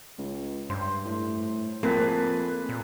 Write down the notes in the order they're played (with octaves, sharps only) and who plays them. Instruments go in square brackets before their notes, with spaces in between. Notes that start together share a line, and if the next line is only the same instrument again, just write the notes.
[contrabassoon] C#2
[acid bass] G2 [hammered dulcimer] C5
[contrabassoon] A2
[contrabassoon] F2 [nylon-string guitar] A#3 [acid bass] C4 [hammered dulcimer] G#4 B4 A5
[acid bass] A#2